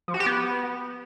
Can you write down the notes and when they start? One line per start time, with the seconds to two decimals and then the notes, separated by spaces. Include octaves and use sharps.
0.08 F3
0.14 F#4
0.20 G4
0.26 B3